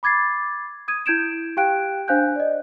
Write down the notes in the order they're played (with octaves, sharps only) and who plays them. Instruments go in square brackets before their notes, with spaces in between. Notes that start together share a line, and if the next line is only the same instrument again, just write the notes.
[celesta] B5 D6 G#6 A6 C7
D#6 G#6 D#7
E4 G6 G#6 D7 E7
G4 F5 G5 F#6 D7
D4 C5 F5 G#5 F#6 G6
D5 D#5